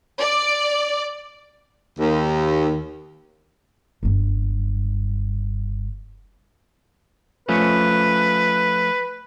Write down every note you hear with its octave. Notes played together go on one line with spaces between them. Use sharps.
D5
D#2
F#1 G2
F3 A3 C#4 B4